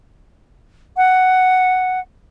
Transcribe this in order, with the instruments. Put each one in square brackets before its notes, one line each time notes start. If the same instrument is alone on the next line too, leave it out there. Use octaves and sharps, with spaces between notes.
[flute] F#5